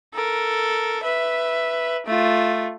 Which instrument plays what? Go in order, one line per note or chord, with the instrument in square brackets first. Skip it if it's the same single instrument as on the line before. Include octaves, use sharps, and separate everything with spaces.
[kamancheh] A4 A#4
B4 E5
A3 F4